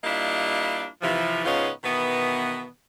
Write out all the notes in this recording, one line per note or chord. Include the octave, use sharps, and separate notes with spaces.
G3 A#3 D4 E4 F4 D#5
C3 E3 F3
G#2 C#3 B3 C#4 D#4 F4
B2 D#3 E3 B3